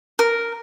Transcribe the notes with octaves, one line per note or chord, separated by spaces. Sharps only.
A#4